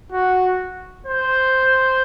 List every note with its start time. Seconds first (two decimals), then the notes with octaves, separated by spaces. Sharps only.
0.12 F#4
1.06 C5